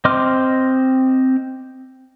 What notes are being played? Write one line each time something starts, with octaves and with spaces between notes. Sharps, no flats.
C4 D#5 C6 D6 F6